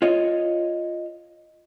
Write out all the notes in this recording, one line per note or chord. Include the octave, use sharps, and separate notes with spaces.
F4 C#5 D#5